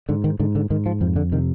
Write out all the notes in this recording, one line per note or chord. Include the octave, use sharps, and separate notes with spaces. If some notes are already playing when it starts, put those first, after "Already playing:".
G#2 D3
D#3
G#2 D3
D3
G#2 D#3
F3
F2 F3
D3
C3 D#3